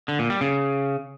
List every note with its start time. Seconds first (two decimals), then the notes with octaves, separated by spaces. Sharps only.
0.08 D3
0.19 A#2
0.30 G3
0.41 C#3